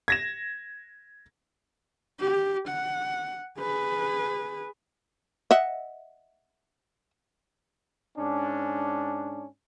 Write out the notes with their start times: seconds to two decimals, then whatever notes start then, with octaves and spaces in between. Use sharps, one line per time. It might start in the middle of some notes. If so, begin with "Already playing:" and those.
0.08 G#6 A#6 E7
2.20 G4
2.68 F#5
3.60 G#4 B4
5.51 D#5 E5 F#5
8.17 G#2 C#4 D4